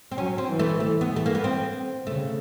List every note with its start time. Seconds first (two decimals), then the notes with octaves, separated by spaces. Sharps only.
0.12 C4
0.17 F#3 C#4
0.38 C4
0.49 E3
0.59 A3
0.80 E3 A3
1.01 B3
1.11 E3 A3
1.26 A#3
1.35 B3
1.44 C4
2.06 C#3 A3